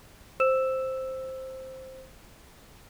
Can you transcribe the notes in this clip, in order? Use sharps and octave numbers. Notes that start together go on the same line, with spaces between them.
C5 E6 E7